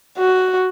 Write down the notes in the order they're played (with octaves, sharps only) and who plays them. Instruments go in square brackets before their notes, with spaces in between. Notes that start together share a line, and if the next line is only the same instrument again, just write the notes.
[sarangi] F#4